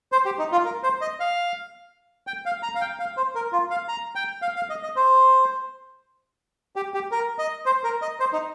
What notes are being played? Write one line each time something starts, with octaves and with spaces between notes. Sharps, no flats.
C5
G4
D#4
F4
A#4
C5
D#5
F5
G5
F5
A#5
F5
G5
F5
C5
A#4
F4
F5
A#5
G5
F5
F5
D#5
D#5
C5
G4
G4
A#4
D#5
C5
A#4
D#5
C5
D#4